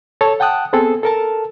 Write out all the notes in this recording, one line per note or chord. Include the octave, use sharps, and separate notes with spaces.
A4 C#5 A5
F#5 G5 A5 D#6 F#6
B3 C4 G#4 A4
A4 A#4 A5